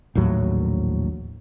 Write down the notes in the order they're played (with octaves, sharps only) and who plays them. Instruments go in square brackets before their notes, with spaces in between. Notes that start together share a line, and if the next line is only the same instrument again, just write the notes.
[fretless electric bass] A#1 D#2 A2 F#3